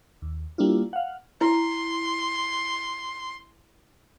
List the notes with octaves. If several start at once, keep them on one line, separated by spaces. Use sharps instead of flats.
D#2
G3 A#3 D4 E4 F4
F5 F#5
E4 C6